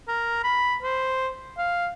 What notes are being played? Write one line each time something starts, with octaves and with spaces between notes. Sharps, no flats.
A#4
B5
C5
F5